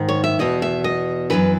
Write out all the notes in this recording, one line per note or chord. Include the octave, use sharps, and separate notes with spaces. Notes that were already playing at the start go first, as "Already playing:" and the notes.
Already playing: G#2 D#3
C#5
E5
E2 B2 D#5
E5
D#5
F#2 C#3 E3 B4